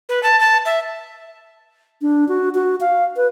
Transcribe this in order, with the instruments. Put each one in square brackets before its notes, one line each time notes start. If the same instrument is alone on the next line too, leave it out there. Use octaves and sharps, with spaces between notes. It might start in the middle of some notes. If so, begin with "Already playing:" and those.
[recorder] B4
A5
A5
E5
[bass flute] D4
F#4
F#4
F5
B4